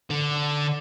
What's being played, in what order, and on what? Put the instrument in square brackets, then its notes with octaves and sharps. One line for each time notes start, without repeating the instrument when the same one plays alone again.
[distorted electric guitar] D3